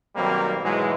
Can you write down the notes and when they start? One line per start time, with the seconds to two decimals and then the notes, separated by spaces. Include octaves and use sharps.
0.16 B1 D#3 F#3 G3 A#3 C4
0.63 G#2 B2 E3 F#3 G#3